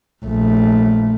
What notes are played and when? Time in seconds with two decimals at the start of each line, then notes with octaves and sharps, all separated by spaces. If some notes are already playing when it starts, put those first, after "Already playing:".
0.25 A#1 A3